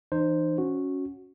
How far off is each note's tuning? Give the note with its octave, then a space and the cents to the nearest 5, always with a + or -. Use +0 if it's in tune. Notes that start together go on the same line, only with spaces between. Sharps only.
E3 +0 D#4 -35 C5 +0
C#4 +0 F#4 -10